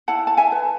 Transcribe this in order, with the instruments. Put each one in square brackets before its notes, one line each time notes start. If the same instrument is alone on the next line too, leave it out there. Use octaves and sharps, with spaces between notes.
[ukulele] E4 F#5 A5
A5
E5 G#5
B4